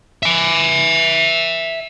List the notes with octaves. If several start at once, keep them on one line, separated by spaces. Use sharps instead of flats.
E5 G#5